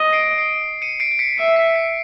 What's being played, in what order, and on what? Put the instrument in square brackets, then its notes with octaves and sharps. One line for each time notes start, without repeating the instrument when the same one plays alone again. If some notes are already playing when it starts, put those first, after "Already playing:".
Already playing: [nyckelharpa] D#5
[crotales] C7 D7
C7 D7
C#7 D#7
C7 D7
C7
B6 C#7
[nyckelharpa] E5 [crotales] C7
[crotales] B6
C7